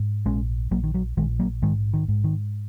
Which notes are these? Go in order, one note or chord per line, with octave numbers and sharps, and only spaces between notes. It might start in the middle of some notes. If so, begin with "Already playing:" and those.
Already playing: G#2
A#1 G#3 C#4
A#1 F#3 A#3
D#3
F#3
A#1 D#3 G#3
F#3 A#3
G#2 D#3 G#3
D#3
G#2
D#3